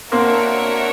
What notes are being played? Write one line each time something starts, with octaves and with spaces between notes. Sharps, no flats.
A#3 C4 D4 F#4 A#4 C#5 E5